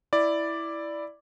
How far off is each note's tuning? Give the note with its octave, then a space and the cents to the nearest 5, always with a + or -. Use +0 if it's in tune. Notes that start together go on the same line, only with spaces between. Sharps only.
E4 +0 D5 +0